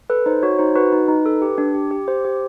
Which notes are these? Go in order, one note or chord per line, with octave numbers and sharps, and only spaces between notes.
A4 B4
D#4 C5
F#4 C#5
D#4 C5
F#4 B4
D#4
D#4
A4
G4
D4
G4
G4
G4 C5
G4